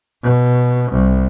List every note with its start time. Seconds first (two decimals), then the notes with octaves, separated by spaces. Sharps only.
0.23 B2
0.91 C2